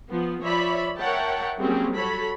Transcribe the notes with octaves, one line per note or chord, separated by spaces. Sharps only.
F3 B3
F3 C#5 D5 E5 B5
A#4 C#5 E5 F#5 G5 A5
F#3 G3 A#3 C4 C#4 G#4
F#4 A4 C#5 B5